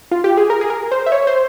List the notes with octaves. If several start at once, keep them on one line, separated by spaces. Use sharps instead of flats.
F4
G4
G#4
A#4
G#4
A#4
C5
E5
C#5
C5